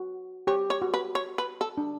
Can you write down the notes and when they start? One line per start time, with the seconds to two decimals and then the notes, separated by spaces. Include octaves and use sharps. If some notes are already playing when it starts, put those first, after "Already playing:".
Already playing: F#4
0.47 G4 C#5
0.70 C#5
0.82 F#4
0.94 B4
1.15 C#5
1.38 B4
1.61 A4
1.78 D4